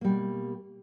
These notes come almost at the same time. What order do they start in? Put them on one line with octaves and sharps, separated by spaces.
A#3 G3 B2